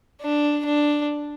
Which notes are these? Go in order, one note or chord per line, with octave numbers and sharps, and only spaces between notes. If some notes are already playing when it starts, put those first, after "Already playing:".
D4
D4